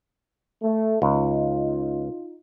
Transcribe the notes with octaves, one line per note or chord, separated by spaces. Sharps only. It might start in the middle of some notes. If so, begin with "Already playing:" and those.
A3
C#2 D#4 F4